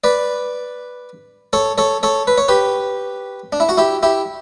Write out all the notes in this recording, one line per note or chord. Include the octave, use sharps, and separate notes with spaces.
B4 D5
A4 C#5
A4 C#5
A4 C#5
B4
C#5
G4 B4
D4
E4
F#4
E4 G4
E4 G4